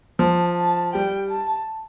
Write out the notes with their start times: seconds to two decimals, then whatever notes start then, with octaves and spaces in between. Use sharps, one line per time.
0.19 F3 A5
0.57 A5
0.94 G3 G5
1.31 A5